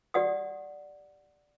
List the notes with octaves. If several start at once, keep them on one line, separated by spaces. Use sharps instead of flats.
G4 D5 F#5 D#6